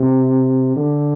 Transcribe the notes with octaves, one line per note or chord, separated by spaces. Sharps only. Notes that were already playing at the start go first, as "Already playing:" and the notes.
Already playing: C3
D3